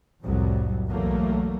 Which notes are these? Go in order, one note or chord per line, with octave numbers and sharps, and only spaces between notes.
C2 F2 A2 F#3 G3
B1 E2 F#3 A3 A#3